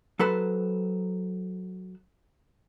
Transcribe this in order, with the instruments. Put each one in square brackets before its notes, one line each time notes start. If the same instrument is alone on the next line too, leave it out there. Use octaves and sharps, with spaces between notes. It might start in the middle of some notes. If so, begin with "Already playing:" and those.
[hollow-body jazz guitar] F#3 A4 B4 C5